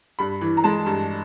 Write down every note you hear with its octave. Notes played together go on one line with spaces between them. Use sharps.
G2 B5
E3
A#5
G#3 A5
G2